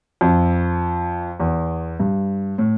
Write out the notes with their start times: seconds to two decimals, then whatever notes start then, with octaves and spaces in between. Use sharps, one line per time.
0.21 F2
1.40 E2
2.00 G2
2.58 A2